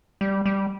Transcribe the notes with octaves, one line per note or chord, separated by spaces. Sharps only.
G3
G3